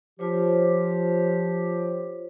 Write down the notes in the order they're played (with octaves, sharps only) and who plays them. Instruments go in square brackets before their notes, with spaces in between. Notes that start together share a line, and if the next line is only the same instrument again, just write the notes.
[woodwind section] F3 G4 [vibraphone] F4 C5 C#5